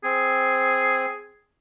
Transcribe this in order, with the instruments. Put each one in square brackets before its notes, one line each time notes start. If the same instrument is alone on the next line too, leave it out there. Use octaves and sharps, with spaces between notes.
[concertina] C4 [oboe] G#4